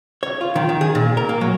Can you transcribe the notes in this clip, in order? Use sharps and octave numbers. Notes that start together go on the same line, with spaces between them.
C#5
F4
D#3
D#3
G#4
A#2
A#4
A#3
F#3